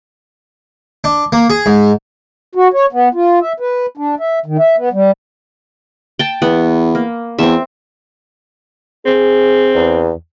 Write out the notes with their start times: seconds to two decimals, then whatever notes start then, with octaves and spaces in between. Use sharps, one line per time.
1.04 D4
1.32 A#3
1.50 G#4
1.66 G#2
2.55 F#4
2.74 C#5
2.93 B3
3.14 F4
3.41 E5
3.60 B4
3.97 D4
4.20 E5
4.46 D#3
4.59 E5
4.77 B3
4.93 G3
6.19 G5 A5
6.42 E2 B3
6.95 A#3
7.39 E2 C4 E5
9.06 C4 G#4
9.75 E2